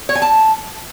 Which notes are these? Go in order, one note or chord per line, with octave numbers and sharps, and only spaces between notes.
C#5
G#5
A5